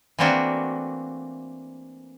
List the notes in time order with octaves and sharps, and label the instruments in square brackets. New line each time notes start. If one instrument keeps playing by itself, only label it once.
[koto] E3 A3 A#3 C4 D4 F#4